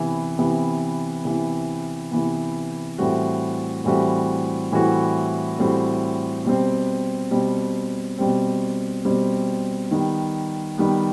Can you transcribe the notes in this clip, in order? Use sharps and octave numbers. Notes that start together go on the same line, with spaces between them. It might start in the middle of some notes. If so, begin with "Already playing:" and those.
Already playing: C3 E3 B3
C3 E3 B3
C3 E3 B3
C3 E3 B3
A2 E3 G3 C4 F#4
A2 E3 G3 C4 F#4
A2 E3 G3 C4 F#4
A2 E3 G3 C4 F#4
B2 G3 C4
B2 G3 C4
B2 G3 C4
B2 G3 C4
D#3 G3 B3
D#3 G3 B3